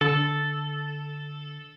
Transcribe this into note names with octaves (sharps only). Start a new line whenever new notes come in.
D3 A4